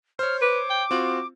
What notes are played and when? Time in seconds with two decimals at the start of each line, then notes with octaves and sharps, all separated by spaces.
0.19 C5 C#5 F6
0.41 B4 D6
0.70 G5
0.91 C4 F4 F#4